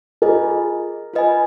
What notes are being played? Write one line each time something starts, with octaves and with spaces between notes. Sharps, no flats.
F4 G#4 A#4 D#5 G#5
F4 B4 D#5 G#5